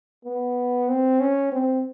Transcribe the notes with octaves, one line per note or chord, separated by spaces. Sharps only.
B3
C4
C#4
C4